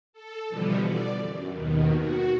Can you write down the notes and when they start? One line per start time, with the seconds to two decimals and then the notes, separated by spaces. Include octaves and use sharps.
0.13 A4
0.49 B2 D3 E3 F3 G3 B3
0.83 D5
1.19 F#2
1.52 D#2 B2 D#3
1.96 F#4